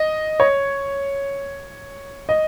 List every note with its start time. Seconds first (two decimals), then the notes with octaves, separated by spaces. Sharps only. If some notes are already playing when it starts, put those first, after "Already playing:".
Already playing: D#5
0.40 C#5
2.29 D#5